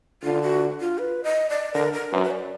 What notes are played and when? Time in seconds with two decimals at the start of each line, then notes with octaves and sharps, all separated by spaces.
0.23 D3 F4
0.42 F#4
0.81 F4
0.98 B4
1.24 D#5
1.50 D5
1.74 D3 A#4
1.93 A#4
2.12 F#2 B4
2.24 B4
2.31 D5